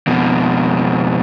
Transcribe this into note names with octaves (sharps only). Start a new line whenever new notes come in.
F2 B2